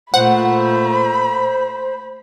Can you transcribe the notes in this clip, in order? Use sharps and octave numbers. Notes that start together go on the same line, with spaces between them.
A#2 A3 C5 F#5 B5